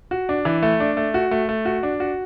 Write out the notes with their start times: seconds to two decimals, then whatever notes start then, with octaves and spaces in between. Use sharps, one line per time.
0.11 F#4
0.29 D4
0.45 E3
0.62 A3
0.80 D4
0.97 A3
1.14 F#4
1.31 A3
1.49 A3
1.65 F#4
1.83 D4
2.00 F#4